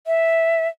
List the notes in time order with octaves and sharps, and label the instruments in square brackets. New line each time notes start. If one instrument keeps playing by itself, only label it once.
[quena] E5